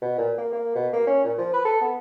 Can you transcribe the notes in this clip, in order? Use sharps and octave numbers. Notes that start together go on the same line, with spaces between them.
B2
A#2
A#3
A#3
B2
A#3
C#4
A#2
F3
B4
A4
B3